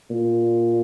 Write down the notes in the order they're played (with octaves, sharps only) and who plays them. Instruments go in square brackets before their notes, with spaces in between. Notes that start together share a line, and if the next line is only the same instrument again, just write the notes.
[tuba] A#2